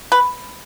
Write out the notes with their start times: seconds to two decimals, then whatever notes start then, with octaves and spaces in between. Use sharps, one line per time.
0.12 B4